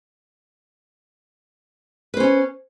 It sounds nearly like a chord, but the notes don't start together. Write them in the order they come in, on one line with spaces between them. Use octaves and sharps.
B4 C5 C#4